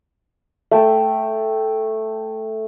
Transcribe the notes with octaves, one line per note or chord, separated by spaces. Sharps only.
A3 G5 A5